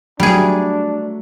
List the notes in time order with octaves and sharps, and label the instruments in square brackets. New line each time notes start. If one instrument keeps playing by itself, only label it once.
[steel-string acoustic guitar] F#3 A3 [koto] G3 G#4 [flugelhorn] D4